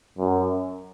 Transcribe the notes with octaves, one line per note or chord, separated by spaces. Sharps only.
F#2